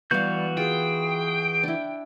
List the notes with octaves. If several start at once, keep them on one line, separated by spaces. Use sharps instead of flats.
E3 G3 B3 F#4 F5 G6
F4 G#4 G5
D4 E4